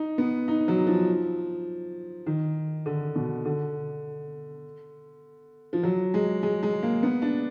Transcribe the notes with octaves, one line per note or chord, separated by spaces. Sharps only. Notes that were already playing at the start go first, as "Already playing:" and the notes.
Already playing: D#4
B3
D#4
F#3
F3
D#3
D3
B2
D3
F3
F#3
G#3
G#3
G#3
A#3
B3
D4